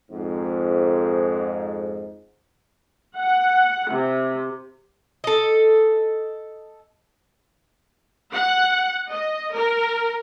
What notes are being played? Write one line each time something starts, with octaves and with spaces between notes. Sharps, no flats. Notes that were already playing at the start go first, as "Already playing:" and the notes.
F2 G#2
F#5
C3
A4 D#5
F#5
D#5
A#4